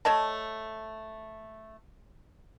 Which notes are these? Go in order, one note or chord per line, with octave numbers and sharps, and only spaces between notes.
A3 C#5 D#5 A5